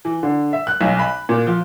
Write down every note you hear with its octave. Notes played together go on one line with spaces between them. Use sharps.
E3
D3
E5
F#6
B1
B5
A#2
F3